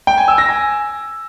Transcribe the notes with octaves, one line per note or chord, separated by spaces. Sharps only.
G5
G#5
E6
A#6
G#5